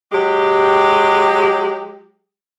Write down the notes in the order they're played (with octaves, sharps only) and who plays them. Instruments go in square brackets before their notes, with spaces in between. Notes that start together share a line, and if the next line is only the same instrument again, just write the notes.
[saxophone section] F#3 G#3 G4